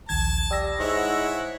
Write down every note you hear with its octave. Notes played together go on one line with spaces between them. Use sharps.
A#1 D#2 A5 G#6
G3 D#6 E6 A#6
G#2 E4 C#5 F#5